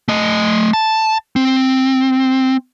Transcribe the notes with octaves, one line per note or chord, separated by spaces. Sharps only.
A3 D#5
A5
C4